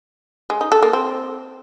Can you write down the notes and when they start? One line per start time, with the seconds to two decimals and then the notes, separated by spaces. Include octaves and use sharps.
0.50 G#3
0.61 D#4
0.72 A4
0.83 A#3
0.93 C4